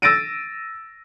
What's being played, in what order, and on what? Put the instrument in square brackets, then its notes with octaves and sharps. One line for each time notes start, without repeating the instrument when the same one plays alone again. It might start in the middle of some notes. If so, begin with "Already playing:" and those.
[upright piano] E6 A6 A#6 D7 D#7